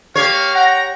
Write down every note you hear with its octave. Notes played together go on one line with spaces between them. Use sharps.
A#3 G4 C#5 F5
F#5 G5 A#5